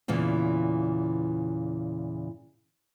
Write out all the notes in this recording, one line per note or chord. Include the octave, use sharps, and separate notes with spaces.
E2 A#2 C#3 E3